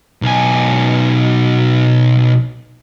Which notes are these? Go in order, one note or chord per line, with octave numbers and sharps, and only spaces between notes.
B1 G#5